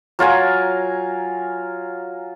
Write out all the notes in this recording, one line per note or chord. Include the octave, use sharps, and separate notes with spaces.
F#3 F4 A#4 G#5